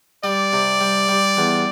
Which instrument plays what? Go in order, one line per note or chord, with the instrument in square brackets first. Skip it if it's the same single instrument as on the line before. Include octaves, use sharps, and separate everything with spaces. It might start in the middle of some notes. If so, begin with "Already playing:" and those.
[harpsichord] G3 [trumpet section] D5
[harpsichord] C3
G3
G3
E2